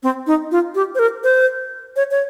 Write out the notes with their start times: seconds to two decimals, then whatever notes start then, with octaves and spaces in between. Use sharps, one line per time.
0.03 C4
0.27 D#4
0.51 F4
0.75 G4
0.95 C5
0.99 A#4
1.24 C5
1.96 C#5
2.11 C#5